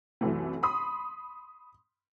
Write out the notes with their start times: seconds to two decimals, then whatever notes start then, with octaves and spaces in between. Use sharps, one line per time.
0.21 C2 F#2 E3 A3
0.63 B5 C6 D#6